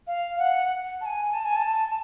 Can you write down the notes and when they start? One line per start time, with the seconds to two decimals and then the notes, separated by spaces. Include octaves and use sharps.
0.07 F5
0.39 F#5
1.01 A5
1.06 G#5
1.33 A5
1.45 G#5
1.56 A5